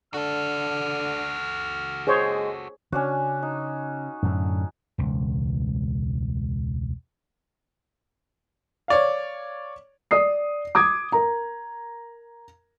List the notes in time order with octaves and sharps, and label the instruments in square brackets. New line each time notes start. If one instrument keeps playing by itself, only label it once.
[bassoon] D3 [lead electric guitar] F#4 A4 [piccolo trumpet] F6
[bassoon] G#3 [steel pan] G#4 C5 C#5
[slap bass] C#3 [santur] C#4 D4 F#4
[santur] D#4
[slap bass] F#2 A2 D3
E1 C#2
[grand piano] C#5 D5 F5
[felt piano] D5 D#6 C7
D6 D#6 G#6
A#4 A#5